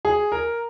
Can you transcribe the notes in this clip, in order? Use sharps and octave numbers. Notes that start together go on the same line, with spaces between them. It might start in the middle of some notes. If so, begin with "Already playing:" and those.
G#4
A#4